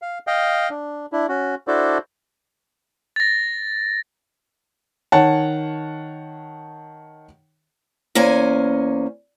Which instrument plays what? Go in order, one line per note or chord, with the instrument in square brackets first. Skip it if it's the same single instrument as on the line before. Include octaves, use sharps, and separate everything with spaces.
[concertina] F5
D#5 F5 G5
D4
D4 E4
C#4 F#4
D4 E4 F#4 A4 C5 D5
[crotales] A6 A#6
[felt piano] D#3 C#5 F#5 A5
[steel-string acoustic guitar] E2 A#3 C#4 C5 G#5